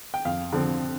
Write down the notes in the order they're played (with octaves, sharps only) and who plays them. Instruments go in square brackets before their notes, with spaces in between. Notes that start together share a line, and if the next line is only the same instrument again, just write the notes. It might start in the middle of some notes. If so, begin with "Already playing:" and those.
[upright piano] G5
F2 F5
D3 F3 C4